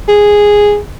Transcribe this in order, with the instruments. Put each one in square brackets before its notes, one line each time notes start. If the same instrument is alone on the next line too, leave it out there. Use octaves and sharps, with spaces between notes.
[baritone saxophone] G#4